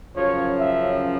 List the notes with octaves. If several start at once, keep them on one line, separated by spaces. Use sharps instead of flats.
F#2 C#3 F3 C#5
E5